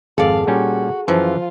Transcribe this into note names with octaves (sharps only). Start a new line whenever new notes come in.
G#1 F2 G#4 A4 D5 F5
A#2 G3 C#4 F#4
F#2 E3 F3 F4